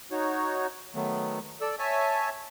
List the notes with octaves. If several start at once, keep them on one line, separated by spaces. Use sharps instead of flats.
D#4 F#4 C#5
D#3 F#3 A3 B3
A4 D5 E6
C#5 E5 G#5 A5